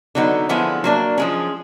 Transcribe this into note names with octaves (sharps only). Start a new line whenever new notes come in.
D3 F#3 B3 D#4
D3 F3 G#3 B3 E4
F#3 A#3 D4
F3 G#3 C#4